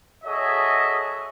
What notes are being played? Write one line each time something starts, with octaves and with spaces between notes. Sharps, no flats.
F#4 G#4 A4 C#5 D#5 E5